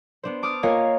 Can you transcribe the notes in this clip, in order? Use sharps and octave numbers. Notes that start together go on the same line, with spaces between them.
B3 D4 C5
A5 D6 D#6 F6
A#3 F4 C#5 D#5 F5 G#5